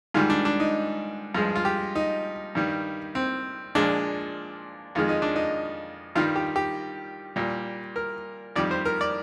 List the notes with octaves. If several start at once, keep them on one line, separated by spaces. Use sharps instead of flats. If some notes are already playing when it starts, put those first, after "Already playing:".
G#2 D#3 G3 F4
D4
D4
D#4
G2 F3 G#3 F4
F4
G4
D#4
G2 D#3 G3
C4
A#2 F3 G#3 D4
F2 D#3 G#3 F4
D#4
D4
D#4
G2 D#3 G3 F4
G4
G4
A#2 G3
A#4
F2 D#3 G3 D5
C5
A#4
D5